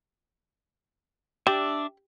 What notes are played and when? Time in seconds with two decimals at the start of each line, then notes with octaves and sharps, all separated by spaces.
1.47 D4 G4 D5 E5